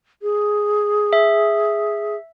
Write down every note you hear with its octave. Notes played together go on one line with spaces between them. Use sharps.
G#4
E5